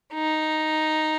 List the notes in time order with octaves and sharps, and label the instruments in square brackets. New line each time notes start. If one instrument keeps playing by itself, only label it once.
[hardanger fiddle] D#4